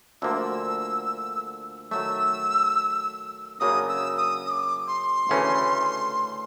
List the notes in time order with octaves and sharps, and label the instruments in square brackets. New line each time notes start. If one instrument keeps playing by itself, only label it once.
[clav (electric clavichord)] D2 D3 F3 A#3 [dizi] E6
[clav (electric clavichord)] D#3 F#3 A3 [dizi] E6
[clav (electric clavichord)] F#2 C#3 F#3 A#3 D4 [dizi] D#6
[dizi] E6
D#6
D#6
D6
C6
[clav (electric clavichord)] D2 C#3 E3 A3 C#4